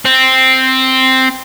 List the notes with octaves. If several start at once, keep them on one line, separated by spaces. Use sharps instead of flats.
C4